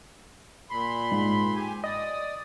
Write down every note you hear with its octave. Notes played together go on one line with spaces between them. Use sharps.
A#2 B5 C6
G#2
G4 G#5
D5 D#5 D#6